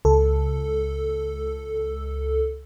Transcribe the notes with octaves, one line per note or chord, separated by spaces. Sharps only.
C#2 A4